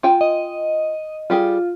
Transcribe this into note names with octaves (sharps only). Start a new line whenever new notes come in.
F4 G5 G#5
D#5
G3 F4 G4 G#4